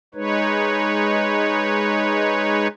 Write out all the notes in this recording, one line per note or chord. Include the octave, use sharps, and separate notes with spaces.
G#3 D#4 B4 C#5